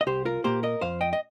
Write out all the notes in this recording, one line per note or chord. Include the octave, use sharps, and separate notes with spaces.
D#5
C2 G4 C5
F4 A#4
A#2 A#3 G4 C5
A#4 D#5
F2 C5 F5
D#5 G5
D#5